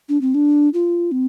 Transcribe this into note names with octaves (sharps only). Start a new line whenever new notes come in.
D4
C4
D4
F4
C4